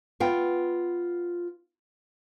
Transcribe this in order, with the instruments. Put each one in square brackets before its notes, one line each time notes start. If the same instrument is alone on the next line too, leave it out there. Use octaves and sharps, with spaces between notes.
[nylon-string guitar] B3 F4 G5